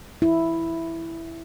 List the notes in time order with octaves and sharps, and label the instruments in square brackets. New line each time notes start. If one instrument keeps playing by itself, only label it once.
[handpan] E4